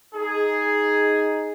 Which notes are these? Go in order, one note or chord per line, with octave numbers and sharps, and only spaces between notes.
D#4 G#4